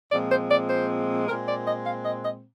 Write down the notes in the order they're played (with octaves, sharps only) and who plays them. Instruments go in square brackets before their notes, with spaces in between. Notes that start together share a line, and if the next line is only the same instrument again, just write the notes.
[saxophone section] A#2 F3 G#3 C4 D5
C5
D5
C5
A#2 G#3 C4 A#4
D5
D#5
F5
D#5
D#5